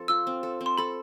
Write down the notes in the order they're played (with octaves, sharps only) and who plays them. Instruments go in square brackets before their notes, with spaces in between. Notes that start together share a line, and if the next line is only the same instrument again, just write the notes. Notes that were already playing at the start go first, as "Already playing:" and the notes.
Already playing: [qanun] F3 C4 A4
[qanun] F4 [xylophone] E6
[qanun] C4
A4
C4
[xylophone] C6
[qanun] A4 [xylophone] B5